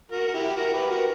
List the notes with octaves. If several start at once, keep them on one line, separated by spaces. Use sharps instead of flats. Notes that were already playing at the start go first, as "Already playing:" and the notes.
F#4 A#4
A#4
E4 G4
F#4 A#4
G4 B4
F#4 A#4